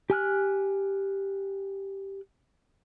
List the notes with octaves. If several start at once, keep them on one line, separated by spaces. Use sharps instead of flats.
G4 G#5 F6 F#6